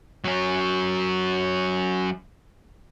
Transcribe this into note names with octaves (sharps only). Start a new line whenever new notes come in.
F#3 C#4